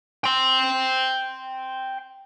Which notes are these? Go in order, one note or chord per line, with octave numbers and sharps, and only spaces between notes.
G5 C6